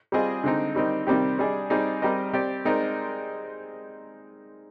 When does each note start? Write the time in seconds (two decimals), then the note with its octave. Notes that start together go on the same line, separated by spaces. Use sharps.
0.12 G3 C4 F4 G#4 D#5
0.44 D3 G#3 C4 D#4
0.75 D#3 G3 C4 D#4
1.07 C3 D#3 G3 C4 G4
1.39 G3 D4 G#4 D#5
1.70 G3 C4 D#4 G#4 D5
2.02 G3 C4 G4 A#4 D#5
2.33 C4 G4 D5
2.65 G#3 C4 D#4 A#4 D5